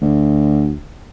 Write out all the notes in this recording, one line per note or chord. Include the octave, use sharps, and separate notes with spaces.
D2